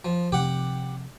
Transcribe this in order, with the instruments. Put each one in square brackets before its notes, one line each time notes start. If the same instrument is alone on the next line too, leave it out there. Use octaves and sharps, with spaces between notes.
[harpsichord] F3
[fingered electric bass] C3 F3 C4 [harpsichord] G4 F#5